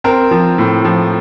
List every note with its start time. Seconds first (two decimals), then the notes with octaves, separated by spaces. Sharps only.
0.04 C4 A#4
0.31 F3
0.58 A2
0.85 F3